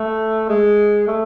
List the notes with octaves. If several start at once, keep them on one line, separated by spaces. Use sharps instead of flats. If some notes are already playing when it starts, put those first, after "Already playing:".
Already playing: A3
G#3
A3